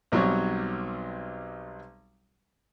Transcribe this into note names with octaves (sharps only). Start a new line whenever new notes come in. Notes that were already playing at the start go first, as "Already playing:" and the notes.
B1 F#3 G3 C4 C#5